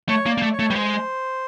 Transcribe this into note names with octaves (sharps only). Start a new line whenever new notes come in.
A3 C#5
A#3
D5
A#3
A3
C#5
A3
G3 B4
G#3 C5